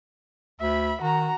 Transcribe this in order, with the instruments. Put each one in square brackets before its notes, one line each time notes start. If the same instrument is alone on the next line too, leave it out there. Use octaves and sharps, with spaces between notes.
[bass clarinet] D2 [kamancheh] E5 B5
[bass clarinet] D#3 [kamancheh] F#4 A#5